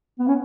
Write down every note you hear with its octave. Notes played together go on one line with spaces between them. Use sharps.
B3
C#4